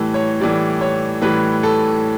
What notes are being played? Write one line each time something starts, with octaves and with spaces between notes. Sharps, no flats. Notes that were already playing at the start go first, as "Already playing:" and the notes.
Already playing: A2 E3 G3 A4
C#5
A2 E3 G3 D5
C#5
A2 E3 G3 B4
A4